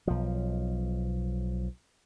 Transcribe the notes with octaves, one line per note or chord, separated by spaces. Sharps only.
B1 F3